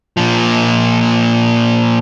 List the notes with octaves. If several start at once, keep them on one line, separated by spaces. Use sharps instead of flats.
A#2 F3